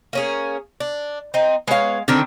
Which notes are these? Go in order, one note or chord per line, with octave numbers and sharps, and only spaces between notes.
A#3 C#4 G#4
D4
C4 D#4
G#3 B3 C#5 F5
D3 D#3 C4 D4